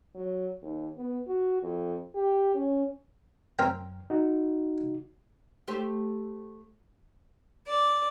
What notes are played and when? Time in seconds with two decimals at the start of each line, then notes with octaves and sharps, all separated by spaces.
0.15 F#3
0.62 D#2
0.97 B3
1.27 F#4
1.62 F2
2.15 G4
2.54 C#4
3.59 F#2 C4 A#4 G5
4.10 D#4 F#4
5.68 A3 G4 C5
7.67 D5